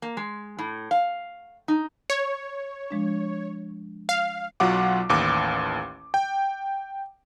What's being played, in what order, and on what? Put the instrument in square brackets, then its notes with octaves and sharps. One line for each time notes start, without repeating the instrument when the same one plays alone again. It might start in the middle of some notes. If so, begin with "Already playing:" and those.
[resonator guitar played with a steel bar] A#3
G#3
A2
F5
D#4
[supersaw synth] C#5
[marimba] F3 G#3 D4
[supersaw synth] F5
[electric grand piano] B1 F#3 F4 F#5 D6
A1 D#2 D6
G5